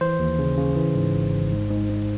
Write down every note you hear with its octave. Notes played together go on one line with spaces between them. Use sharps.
E3 C5
D#2
C#3
C#3
E3
G#2
G#1
G#1
G#2
G#2
G#2